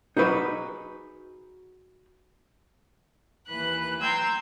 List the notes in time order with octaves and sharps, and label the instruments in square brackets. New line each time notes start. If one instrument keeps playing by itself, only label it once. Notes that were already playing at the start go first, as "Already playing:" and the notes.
[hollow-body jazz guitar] D#4 F#4 G#4 B4 D#5
[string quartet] D#2 E3 B4 F#6
G5 A#5 C6 E6 G6 G#6